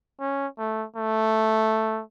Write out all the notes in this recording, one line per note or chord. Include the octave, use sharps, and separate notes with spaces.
C#4
A3
A3